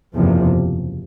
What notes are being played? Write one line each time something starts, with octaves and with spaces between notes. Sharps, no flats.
F#1 E2 C3 F3